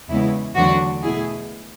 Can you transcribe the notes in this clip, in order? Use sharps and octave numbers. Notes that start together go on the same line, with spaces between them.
E2 C#3 G#3 B3 E4
E2 D3 F#3 A3 D4 F#4
B2 A3 E4 G#4